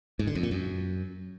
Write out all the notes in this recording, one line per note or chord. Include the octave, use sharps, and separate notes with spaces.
G#2
D3
F2
A#2
F#2